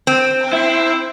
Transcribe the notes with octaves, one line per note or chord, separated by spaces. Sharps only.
C4
E4